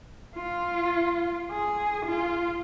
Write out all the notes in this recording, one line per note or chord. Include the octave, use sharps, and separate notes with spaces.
F4
G#4
F4